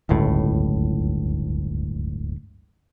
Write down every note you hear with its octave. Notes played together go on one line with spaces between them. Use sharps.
D1 G1 C#2 A2